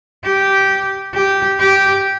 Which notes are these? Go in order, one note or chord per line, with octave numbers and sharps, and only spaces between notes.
G4
G4
G4